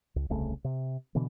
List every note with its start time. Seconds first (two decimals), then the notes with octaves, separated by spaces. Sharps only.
0.16 C#2
0.29 D#1 C2 C#3 A3
0.64 C3
1.15 B2 D3 E3